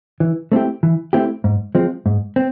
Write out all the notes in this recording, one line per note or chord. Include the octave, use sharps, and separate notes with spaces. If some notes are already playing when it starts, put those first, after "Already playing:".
E3
A3 C4 E4 G4
E3
A3 C4 E4 G4
G#2
F3 G#3 C4
G#2
C4